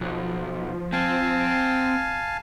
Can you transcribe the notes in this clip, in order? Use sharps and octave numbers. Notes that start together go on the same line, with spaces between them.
B1 F3
C4 F5 G#5 A5